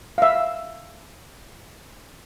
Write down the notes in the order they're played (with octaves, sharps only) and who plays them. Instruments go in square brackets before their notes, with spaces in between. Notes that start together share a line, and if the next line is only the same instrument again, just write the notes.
[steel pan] E5 F5